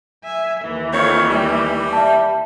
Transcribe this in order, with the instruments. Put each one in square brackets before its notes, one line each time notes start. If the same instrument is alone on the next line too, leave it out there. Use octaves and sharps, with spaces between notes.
[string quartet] E5 G#5
D#2 E3
[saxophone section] F2 D#3 C#5
G3
[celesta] E5 A5